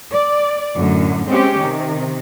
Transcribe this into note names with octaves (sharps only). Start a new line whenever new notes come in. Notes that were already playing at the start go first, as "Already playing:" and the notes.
D5
F#2 A2 D3
G#3 C4 C#4 G4
C3 D#3